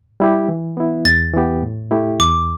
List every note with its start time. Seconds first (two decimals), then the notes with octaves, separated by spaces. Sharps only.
0.20 G3 E4 G4
0.49 E3
0.77 B3 E4
1.05 E2 A6
1.34 E3 B3 G4
1.63 A2
1.91 A3 E4 G4
2.20 E2 D6